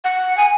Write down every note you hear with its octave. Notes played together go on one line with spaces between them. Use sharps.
F#5
G#5